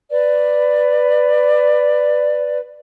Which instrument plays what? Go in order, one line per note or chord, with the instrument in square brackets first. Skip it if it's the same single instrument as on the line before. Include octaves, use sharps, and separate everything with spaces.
[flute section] B4 D5